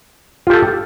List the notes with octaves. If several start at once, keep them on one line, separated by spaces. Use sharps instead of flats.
F4 G4 A4